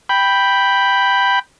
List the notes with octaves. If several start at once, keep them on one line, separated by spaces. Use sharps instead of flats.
G5 B5